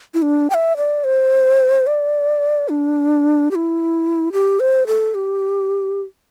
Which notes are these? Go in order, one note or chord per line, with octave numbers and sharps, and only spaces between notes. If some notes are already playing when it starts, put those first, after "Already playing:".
E4
D4
G5
E5
D5
C5
D5
D4
G4
E4
G4
C5
A4
G4